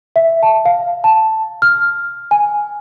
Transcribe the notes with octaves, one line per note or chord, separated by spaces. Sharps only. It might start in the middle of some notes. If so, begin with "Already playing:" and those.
E5
A5
F5
A5
F6
G#5